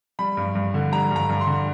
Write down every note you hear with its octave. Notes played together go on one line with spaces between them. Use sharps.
G3 B5
G2
G2
D3
G3 A#5
G2 A#5
G2
C6
D3